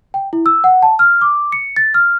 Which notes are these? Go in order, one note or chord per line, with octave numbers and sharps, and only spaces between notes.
G5
E4
E6
F#5
A5
F6
D6
C#7
A6
F6